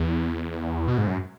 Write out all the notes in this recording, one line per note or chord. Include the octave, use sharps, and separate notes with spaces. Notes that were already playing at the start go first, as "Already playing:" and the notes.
Already playing: E2
B2
G#2
F#2